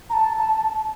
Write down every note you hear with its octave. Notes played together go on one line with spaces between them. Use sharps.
A#5
A5